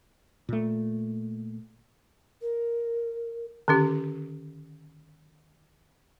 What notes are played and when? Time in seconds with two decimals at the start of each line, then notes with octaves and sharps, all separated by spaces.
0.49 A#2 A3
2.41 A#4
3.68 D3 D#3 C#4 G4